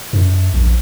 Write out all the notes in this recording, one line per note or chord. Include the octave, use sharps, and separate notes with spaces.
F#2
A#1